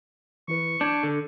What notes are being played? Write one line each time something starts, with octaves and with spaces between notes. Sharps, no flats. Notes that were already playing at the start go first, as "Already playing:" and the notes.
E3 E4 B4 C#6
D4 G6 G#6
D3